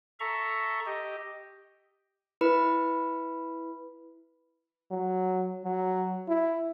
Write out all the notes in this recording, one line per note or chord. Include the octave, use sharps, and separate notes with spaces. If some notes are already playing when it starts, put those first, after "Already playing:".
A4 E5 A#5 C#6
G4 D#5
E4 B4 B5
F#3
F#3
E4